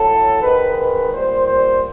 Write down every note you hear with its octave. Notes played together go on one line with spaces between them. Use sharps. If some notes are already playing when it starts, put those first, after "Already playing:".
Already playing: A2 F#3 A4
G#2 D#3 G#3 B4
B4
A#2 G3 C5
C5